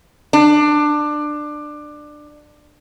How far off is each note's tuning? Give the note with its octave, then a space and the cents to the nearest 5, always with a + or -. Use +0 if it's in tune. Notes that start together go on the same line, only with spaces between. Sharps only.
D4 +20